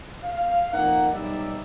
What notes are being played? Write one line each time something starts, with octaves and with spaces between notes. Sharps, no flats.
F5
F2 A#3 D#4 F#5
B1 G3 D#4 D5 E5